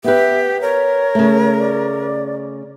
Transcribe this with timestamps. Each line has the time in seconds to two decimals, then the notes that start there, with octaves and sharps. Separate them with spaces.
0.04 B3 G4 B4 E5
0.61 A#4 C#5
1.15 C#3 A3
1.59 D5